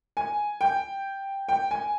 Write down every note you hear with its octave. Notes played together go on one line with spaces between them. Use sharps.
G#5
G5
G5
G#5